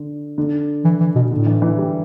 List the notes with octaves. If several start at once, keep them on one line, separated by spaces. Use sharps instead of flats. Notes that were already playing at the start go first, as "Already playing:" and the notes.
Already playing: D3
D3
E3
E3
B2
A2 D3
E3
E3
G3